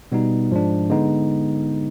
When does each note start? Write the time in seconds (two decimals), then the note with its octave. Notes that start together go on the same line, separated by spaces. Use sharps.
0.12 B2 G3 B3 D#4
0.51 G#2 F3 G#3 D4
0.90 D3 G#3 B3 D#4